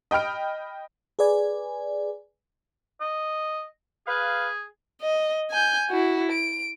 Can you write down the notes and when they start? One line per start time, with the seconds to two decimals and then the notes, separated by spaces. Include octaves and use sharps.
0.11 D#5 G5 B5 F6 D7
1.19 G#4 B4 D5 G#5
3.01 D#5
4.07 G#4 B4 F5
5.02 D#5
5.51 G#5 G6
5.90 E4 F#4
6.32 D7